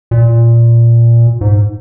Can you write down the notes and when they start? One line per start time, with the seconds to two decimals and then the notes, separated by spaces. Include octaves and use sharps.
0.11 A#2
1.41 G#2